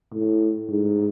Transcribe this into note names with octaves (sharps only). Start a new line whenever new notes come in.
A2
G#2